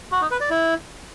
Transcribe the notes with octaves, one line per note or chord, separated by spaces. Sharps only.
F#4
D#4
B4
D5
E4